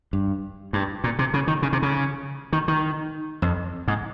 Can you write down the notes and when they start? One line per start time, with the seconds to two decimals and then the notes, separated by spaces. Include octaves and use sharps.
0.13 G2
0.73 G2
1.04 A#2
1.19 C3
1.34 C#3
1.47 D#3
1.62 C#3
1.73 C3
1.82 C#3
2.53 D#3
2.68 D#3
3.42 F2
3.88 G#2